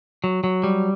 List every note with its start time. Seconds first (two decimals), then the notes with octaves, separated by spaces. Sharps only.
0.24 F#3
0.44 F#3
0.64 G3